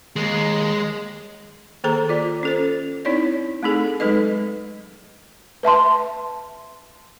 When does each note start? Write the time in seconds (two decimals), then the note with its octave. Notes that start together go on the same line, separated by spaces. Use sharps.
0.16 D#2 G#3
1.84 D#3 A#3 G#4 A4 C5 A#5
2.09 F4 D5
2.43 C#4 A4 C5
3.05 C4 D#4 E4 C#5 D5
3.63 A3 C4 D#4 G#4 A4
4.00 F#3 G#3 D#4 A4 B4 D#5
5.63 B4 E5 A5 C6